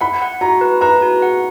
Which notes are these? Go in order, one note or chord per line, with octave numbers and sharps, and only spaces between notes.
F#5 B5
F#5
F#4 A#5
B4
B4 A#5
F#4
F#5